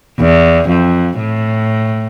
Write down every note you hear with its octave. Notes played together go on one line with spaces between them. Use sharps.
E2
F2
A2